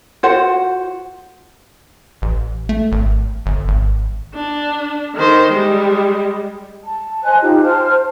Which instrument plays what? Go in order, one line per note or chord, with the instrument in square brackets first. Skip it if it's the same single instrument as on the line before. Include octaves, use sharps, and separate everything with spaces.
[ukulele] F4 F#4 C5 F#5
[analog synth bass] A1
A3
G#1
G1
G#1
[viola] D4
D#3 C5
G3 G#3
[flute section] A5
C5 D#5 G#5 F#6
D#4 F4 G4
C5 A5 F6